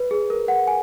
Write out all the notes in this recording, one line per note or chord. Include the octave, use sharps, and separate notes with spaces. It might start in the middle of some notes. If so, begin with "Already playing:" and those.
Already playing: B4
G#4
A#4
F#5
G#5